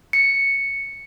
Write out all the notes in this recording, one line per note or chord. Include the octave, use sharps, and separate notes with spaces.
C#7